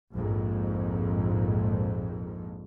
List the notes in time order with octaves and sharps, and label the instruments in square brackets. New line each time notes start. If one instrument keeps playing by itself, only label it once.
[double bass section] A#1 F2 G#2